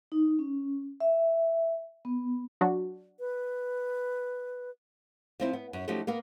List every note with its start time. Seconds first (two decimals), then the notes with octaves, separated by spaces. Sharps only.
0.12 D#4
0.39 C#4
1.00 E5
2.05 B3
2.61 F#3 D4 F#4
3.19 B4
5.40 F3 C4 E4
5.53 B3
5.73 F#2
5.88 F3 F#3 A3 C#4 D#4 G4
6.07 A#3 B3 A#4